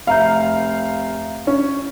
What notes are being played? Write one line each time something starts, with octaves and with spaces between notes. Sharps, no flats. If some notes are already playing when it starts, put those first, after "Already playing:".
F1 E5 F5 A#5 G6
C#4